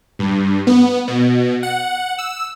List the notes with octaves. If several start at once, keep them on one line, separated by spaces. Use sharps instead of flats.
G2
B3
B2
F#5
E6